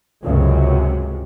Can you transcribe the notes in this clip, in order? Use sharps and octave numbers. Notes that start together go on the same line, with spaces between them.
C#2 F#2 C3